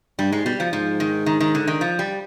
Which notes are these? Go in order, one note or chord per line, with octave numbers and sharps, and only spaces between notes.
G2 G3
G#2 G#3
B2 G3
F3
G#2 F3
D#3
D#3
D#3
D3
D#3
F3
G3